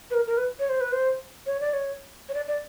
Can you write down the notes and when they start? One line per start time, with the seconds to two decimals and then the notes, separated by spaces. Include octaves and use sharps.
0.10 B4
0.14 A#4
0.27 A#4
0.37 B4
0.59 C#5
0.69 C5
0.81 B4
0.92 C5
1.46 C#5
1.60 D5
1.73 C#5
2.29 C#5
2.34 D5
2.48 D5